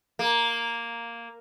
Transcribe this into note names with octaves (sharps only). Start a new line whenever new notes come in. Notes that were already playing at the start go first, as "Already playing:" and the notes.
A#3